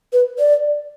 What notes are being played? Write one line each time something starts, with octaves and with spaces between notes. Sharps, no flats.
B4
D5